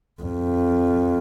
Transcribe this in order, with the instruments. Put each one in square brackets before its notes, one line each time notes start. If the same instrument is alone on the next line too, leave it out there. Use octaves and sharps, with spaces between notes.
[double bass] F2